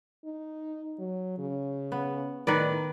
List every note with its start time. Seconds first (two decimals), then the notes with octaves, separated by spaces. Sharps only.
0.25 D#4
0.99 F#3
1.38 C#3
1.92 B3
2.47 A2 D#3 B4 D5